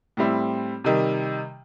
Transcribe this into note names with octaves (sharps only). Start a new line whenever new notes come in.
A2 G3 C4 E4
C3 D#3 G3